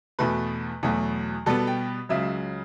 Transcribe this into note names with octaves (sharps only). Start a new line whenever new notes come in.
E2 B2 A3 B4
E2 B2 F#3 A3
B2 G3 B3 A4
G5
C#2 C#3 F#3 E5